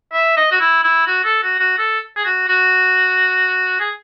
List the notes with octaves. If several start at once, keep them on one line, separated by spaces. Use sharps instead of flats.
E5
D#5
F#4
E4
E4
F#4
A4
F#4
F#4
A4
G#4
F#4
F#4
G#4